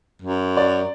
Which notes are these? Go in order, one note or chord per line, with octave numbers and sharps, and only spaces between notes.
F#2
D5